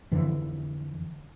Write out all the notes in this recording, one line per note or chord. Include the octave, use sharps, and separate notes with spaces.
F2 D3 E3